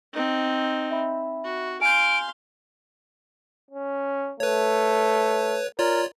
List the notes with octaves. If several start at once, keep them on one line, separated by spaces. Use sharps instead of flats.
C4 D#4
E5 B5
F#4
F5 G#5 C6 G6 D7
C#4
A3 B4 C#5
F4 A#4 C#5 D5